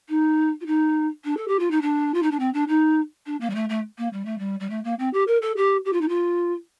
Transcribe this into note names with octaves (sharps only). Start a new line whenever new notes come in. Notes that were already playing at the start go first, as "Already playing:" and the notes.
D#4
F4
D#4
D4
A4
G4
F4
D#4
D4
F4
D#4
D4
C4
D4
D#4
D4
A#3
G3
A3
A3
A#3
G3
A3
G3
G3
A3
A#3
C4
G4
A#4
A4
G4
G4
F4
D#4
F4